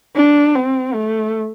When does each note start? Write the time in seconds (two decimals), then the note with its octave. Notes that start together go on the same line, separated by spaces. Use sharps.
0.16 D4
0.55 C4
0.94 A3